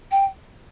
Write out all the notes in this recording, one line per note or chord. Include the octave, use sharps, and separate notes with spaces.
G5